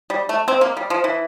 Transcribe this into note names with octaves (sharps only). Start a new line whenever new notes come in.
G3
A3
C4
A#3
G3
F3
E3